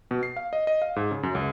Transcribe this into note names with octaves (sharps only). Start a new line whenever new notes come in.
B2
C7
F5
D#5
D#5
F5
G#2
C#3
F#2
C#2